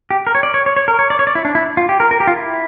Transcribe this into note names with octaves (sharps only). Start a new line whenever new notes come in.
G4
A#4
C#5
D5
C#5
C#5
C#5
A#4
C#5
D5
C#5
D5
E4
D4
E4
F4
G4
A#4
A#4
G4
F4
E4